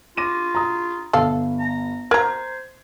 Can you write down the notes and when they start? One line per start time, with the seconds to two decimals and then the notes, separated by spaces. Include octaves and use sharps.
0.17 F4 D6 A#6 D#7
0.55 A#5 D#6
1.13 G1 A4 F5
1.60 A#5
2.11 A#4 C5 A#5 G#6